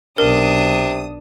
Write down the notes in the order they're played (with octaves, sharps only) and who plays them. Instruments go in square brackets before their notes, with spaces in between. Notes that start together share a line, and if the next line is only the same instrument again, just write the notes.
[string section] B1 D#6 [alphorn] C3 [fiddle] D4 [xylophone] A#4